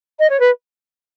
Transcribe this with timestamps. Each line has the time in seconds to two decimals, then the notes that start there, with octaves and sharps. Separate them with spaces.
0.19 D#5
0.30 C#5
0.40 B4